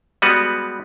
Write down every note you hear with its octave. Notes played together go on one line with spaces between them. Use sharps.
G3 G#3 B3 F#4 B4